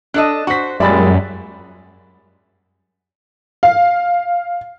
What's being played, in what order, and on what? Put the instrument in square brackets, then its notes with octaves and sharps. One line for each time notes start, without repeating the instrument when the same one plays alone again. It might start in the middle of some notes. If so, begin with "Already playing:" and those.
[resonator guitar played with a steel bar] D4 A4 D#5 [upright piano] A5 F#6
[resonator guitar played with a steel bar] F#4 C5 [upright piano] C#6 B6
[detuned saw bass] F#2 [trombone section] A#2 G3 G#3 [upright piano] D5 B5 A6 [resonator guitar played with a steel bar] E5
[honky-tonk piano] F5